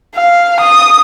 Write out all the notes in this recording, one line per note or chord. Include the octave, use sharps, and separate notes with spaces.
F5
D#6